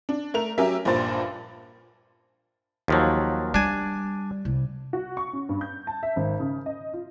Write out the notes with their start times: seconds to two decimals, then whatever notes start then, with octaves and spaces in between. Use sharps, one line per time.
0.09 D4
0.34 A3 A#4 F7
0.58 F#3 C#4 G4 A#4 E5
0.85 A#1 G2 A#2 C5 A6
2.88 D#2 F3 F#3
3.54 G3 D4 G#5
4.45 C2
4.93 F#4
5.17 C#6
5.33 C#4
5.49 G2
5.61 G6
5.87 A5
6.03 E5
6.16 G#1
6.40 C#3
6.66 D#5
6.93 F4